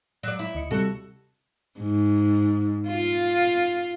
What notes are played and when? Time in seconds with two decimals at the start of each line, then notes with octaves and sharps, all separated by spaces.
0.23 F#3 D5
0.39 E4
0.55 D2 D#5 C#7
0.71 C3 G3 F#4 A4
1.80 G#2
2.88 F4